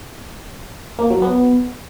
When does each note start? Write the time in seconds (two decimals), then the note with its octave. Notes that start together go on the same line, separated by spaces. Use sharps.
0.99 A#3
1.10 F#3
1.22 B3